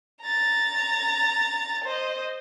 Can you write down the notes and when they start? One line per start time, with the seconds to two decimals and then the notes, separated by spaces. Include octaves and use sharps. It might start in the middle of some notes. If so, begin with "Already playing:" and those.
0.21 A#5 A6
1.84 C5 D#5